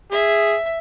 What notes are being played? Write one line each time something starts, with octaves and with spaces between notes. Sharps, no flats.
G#4 E5